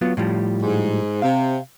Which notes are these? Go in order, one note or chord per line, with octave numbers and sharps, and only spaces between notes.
F#3 B3 F4
A2 F3 G3
G#2
C3 F5